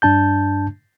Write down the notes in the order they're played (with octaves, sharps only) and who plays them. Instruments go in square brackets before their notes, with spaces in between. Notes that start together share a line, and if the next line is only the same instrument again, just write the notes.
[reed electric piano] G2 D4 A5 G6